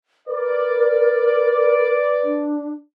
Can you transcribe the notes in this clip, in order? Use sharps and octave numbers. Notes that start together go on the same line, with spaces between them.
A#4 B4 D5
D4